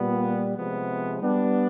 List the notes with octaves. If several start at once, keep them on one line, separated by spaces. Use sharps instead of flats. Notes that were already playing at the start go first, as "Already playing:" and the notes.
Already playing: A#2 G3 B3
C3 F3 G#3 B3
G3 B3 D4